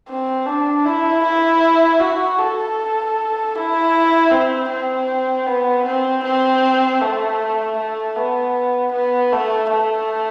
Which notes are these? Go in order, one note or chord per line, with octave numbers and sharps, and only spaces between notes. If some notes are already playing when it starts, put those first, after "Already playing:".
C4
D4
E4
E4
F#4
A4
E4
C4
C4
B3
C4
C4
A3
A3
B3
B3
A3
A3